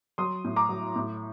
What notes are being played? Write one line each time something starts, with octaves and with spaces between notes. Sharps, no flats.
F#3 C6 D#6
A2
A#5 D6
F#3
A2